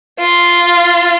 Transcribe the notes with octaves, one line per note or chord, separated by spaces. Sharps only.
F4